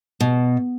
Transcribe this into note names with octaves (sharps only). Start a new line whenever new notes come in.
B2